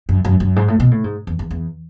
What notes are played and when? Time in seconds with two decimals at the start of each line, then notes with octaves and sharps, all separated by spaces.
0.09 F#2
0.25 F#2
0.40 F#2
0.56 G#2
0.68 A2
0.80 B2
0.91 A2
1.04 G#2
1.27 E2
1.39 E2
1.51 E2